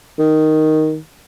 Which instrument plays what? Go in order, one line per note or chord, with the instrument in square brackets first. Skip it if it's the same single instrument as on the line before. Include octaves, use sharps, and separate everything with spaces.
[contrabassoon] D#3